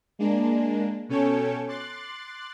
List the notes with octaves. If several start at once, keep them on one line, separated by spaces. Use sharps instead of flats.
G#3 A#3 D4
B2 C#4 A4 C#5 G5 C#6
C6 D6 F#6 A6 C7